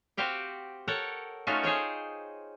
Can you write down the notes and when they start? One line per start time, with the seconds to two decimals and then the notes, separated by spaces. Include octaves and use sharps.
0.17 C4 F#4 G4 F5 G5
0.88 A4 A#4 C#5 F#5 G5
1.47 A3 C#4 D#4 F4 F#4
1.63 G#4 C5 C#5 G5